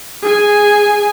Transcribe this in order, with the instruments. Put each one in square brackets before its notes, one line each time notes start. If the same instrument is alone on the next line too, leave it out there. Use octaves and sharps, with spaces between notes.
[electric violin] G#4 G#5